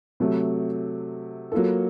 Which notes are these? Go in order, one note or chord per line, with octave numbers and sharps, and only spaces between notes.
C3 F#3 A3
F#3 A#3 F4 A4